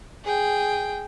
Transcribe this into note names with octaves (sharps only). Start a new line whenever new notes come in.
G#4 G5